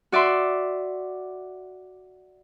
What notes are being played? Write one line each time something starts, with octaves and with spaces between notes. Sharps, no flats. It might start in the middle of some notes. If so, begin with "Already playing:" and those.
F#4 D5 E5 C6